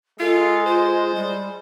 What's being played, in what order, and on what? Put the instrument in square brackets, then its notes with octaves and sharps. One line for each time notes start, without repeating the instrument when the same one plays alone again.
[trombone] G#3 [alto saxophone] F4 [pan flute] A4
[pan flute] F4 [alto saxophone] C5
[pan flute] G3